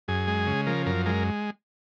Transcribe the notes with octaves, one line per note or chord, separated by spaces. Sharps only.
F#2 G#4
G#3
C#3
F3 A#4
F#2 A#4
G#3 A#4